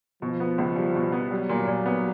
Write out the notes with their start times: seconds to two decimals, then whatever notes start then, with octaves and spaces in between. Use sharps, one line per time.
0.22 B2 F3
0.40 B3
0.58 C#2
0.76 G3
0.95 B2
1.12 B3
1.31 F#3 G3
1.49 A#2
1.67 A#2
1.86 B3